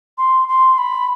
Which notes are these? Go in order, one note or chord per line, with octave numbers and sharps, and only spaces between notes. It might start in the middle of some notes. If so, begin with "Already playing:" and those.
C6
C6
B5